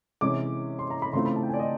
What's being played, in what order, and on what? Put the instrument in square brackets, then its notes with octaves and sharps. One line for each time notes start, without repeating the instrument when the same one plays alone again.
[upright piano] C3 E3 G#3 C#4 E4 D6
C6
A#5
B5
C#3 E3 A3 C4 F4 C6
B5
A5
G5
G#5
D5
D#5